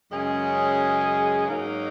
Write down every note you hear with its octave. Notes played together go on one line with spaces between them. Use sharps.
F#2 C#3 G#3 C#4 G#4
G#2 F#3 A#3 D#4